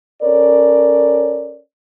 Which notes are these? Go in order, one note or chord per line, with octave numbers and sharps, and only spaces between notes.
C#4 A4 A#4 C#5 D5